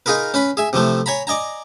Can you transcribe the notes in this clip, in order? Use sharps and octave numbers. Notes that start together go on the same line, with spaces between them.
D#4 F4 G#4 A#4 B4
C#4 B4 B5
G#4 E5 G#5
C3 E3 F3 A3
C#5 G#5 A#5 B5
D5 D#5 G#5 A#5